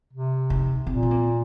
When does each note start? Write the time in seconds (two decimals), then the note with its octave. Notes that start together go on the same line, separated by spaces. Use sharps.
0.13 C3
0.50 D#4
0.86 A#2 C4
1.03 C4
1.11 A#3